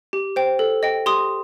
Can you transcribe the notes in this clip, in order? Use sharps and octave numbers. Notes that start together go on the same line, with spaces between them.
G4
C5 G5
A4
D#5 G5
G4 C6 D#6